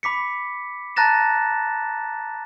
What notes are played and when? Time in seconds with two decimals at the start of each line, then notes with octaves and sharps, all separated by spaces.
0.03 B5 D6 B6 C#7
0.96 A5 A#5 F#6 A6 A#6 E7